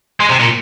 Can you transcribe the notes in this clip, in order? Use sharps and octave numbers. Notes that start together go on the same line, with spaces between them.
G#3
C3
A#2